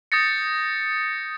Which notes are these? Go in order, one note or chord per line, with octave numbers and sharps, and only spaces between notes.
D#6 G6 A6 A#6 C#7